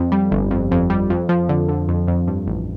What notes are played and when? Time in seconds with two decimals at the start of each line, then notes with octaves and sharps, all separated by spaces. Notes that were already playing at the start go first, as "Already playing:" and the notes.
Already playing: F2
0.12 G3
0.32 G1
0.51 F2
0.72 F2
0.90 G3
1.10 F2
1.29 F3
1.49 D3
1.69 D3
1.88 F2
2.08 F2
2.27 G2
2.47 A1